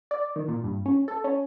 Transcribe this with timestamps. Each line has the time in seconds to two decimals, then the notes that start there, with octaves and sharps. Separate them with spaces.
0.11 D5
0.36 D#3
0.48 A#2
0.64 G2
0.86 C#4
1.08 A4
1.24 C#4